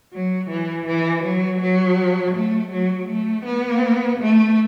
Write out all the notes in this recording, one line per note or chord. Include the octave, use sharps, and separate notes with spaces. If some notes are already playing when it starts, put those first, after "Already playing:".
F#3
E3
E3
F#3
F#3
A3
F#3
A3
B3
A3